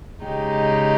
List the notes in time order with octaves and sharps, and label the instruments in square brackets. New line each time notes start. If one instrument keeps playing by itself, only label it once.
[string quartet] C#3 G#3 D#4 G4